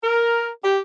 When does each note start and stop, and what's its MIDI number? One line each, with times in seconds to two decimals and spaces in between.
0.04 0.48 70
0.64 0.79 67